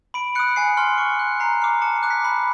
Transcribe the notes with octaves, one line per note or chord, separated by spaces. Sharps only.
B5 D7
D#6 F#6 C#7
G#5 C7
C6 F6
C#6 C#7
F#6
A#5 C7
D6 F6 C7
A5 C#7
C7
D6 F#6
B6
B5